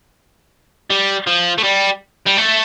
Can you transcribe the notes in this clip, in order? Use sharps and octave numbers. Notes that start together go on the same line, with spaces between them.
G3
F3
A3
G3
G3
A3